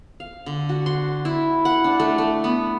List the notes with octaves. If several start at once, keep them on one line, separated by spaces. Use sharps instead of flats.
F5
D3
F#4
C6
E4
F#5
D4
A3
A3
B3